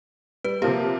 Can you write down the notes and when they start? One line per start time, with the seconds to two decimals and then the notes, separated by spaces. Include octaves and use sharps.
0.44 G3 B4
0.62 C3 F3 A#3 G4